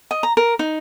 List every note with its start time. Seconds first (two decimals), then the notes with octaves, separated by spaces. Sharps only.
0.11 D#5
0.23 A#5
0.37 A#4
0.59 D#4